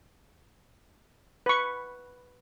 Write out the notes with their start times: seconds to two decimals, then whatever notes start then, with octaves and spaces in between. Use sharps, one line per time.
1.46 B4 C#6